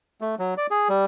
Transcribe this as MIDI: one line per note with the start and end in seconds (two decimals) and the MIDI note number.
0.21 0.35 57
0.39 0.54 54
0.57 0.67 74
0.71 0.88 68
0.89 1.05 55